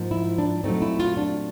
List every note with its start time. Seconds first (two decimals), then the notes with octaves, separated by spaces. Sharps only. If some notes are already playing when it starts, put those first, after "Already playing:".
Already playing: G#2 F3 A#3
0.11 E4
0.38 D4
0.64 A#2 F#3 A3 C4 D#4
0.82 E4
0.99 F4
1.17 D4